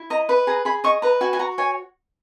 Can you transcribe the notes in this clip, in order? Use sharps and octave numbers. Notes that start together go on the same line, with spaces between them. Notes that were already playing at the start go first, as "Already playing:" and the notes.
Already playing: E4
D#5 A#5
B4 B5
G#4 A#5
G#4 B5
D#5 C#6
B4 A#5
F#4 G#5
G#5
F#4 A#5
C#5 G#5